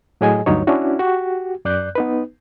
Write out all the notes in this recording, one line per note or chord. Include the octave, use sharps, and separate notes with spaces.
A2 F#3 G#4 D#5 G#5
D2 G2 F#3 D#4 C#5
C#4 D4 E4 F#4
F#4 G4
F#2 D5 F#6 G6
B3 D#4 B4